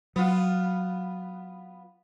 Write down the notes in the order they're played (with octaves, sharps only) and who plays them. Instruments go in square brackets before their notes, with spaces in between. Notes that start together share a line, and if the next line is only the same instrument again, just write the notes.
[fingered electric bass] F#3 [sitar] B3 F4